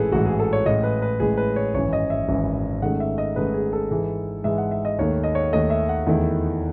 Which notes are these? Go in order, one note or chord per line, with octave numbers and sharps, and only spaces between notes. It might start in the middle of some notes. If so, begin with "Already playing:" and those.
Already playing: A1 G#2 E3 G#4 A4 B4
A1 G#2 E3 F#4
G#4
A4
C#5
A1 A2 G#3 D#5
B4
B4
A1 A2 G#3 G#4
B4
C#5
G#1 F#2 E3 C#5
D#5
E5
G#1 F#2 E3
G#2 D#3 A3 C#4 F#5
E5
D#5
G#2 D#3 A3 C#4 B4
G#4
A4
G#2 E3 G#3
G#2 E3 G#3 E5
F#5
E5
D#5
D#2 D#3 A3 C#5
D#5
C#5
D#2 D#3 A3 D#5
E5
F#5
E2 D#3 A3 E4